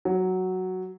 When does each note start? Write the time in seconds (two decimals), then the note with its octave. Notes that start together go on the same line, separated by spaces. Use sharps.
0.05 F#3